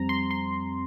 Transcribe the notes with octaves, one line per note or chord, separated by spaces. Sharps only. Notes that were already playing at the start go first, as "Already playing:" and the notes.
Already playing: F2 G3 C4 A#5
C6
C6